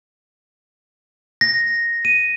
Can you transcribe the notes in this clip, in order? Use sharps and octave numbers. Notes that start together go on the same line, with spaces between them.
A#6
D#7